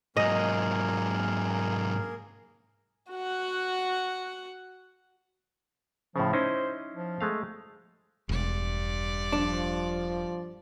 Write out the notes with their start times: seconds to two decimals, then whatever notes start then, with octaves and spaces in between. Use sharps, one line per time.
0.17 G#2 F#3 A#3 G#4 A#4 D#5
3.11 F#4 F#5
6.16 A2 C#3 F3
6.33 C#4 D#4 E4 C5
6.94 F3
7.21 G#3 A3 F5
8.29 E1 G2 D5
9.32 F3 D4